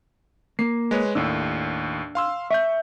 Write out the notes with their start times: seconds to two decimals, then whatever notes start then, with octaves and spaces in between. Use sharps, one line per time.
0.59 A#3 C7
0.91 G#3 B4 C#5
1.15 D#2 A2 D4 E6
2.15 F5 C6 E6
2.51 E5 C#6 G6